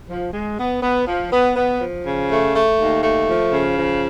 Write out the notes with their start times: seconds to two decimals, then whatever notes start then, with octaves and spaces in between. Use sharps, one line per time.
0.10 F3
0.33 G#3
0.59 B3
0.82 B3
1.07 F3
1.32 B3
1.56 B3
1.81 F3
2.05 C#3
2.30 A3
2.54 A3
2.79 D#2
3.03 A3
3.28 F3
3.52 C#3
3.77 F3